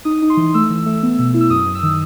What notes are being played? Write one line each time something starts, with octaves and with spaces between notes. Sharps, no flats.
D#4 D#6
D#4
C6
E3
A3 E6
E3
A3
B3
B2
E4
E6
F#2 D#6
F#2
E6
D#3